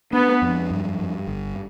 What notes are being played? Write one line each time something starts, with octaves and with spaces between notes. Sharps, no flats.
B3 D4
F2
G2
G2
G1